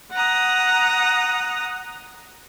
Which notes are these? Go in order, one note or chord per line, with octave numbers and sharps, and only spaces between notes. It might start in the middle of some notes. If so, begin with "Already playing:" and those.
F#5 A#5 D#6